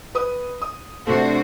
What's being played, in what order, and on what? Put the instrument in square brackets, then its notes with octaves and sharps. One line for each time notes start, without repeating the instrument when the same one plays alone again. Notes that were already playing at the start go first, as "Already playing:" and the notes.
[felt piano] B4 D#6
D#6
[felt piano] C3 A3 [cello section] D4 F#4 C5